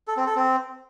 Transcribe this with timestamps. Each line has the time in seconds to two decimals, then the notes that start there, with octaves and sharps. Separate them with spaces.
0.08 A4
0.17 C4
0.26 A4
0.36 C4